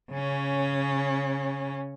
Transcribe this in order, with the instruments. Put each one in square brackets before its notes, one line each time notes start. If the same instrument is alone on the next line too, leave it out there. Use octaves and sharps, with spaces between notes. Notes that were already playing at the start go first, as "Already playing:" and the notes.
[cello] C#3 C#4